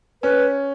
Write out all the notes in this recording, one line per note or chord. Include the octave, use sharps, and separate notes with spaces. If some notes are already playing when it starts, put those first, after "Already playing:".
C#4 B4